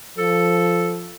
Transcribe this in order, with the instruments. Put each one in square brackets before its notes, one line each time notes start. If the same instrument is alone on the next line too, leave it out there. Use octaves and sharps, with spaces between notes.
[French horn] F3 [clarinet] A4